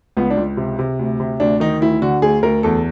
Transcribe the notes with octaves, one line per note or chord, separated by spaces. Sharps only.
C#2 B3
D4
C#2
C3
C3
D2
C3
D2 D4
D#3 D#4
D2 E4
D3 F#4
D2 G#4
D2 A#4
E2 A4